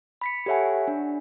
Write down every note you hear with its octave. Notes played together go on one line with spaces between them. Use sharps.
B5 B6 C#7
G4 A4 C#5 E5 F#5 G#5
D4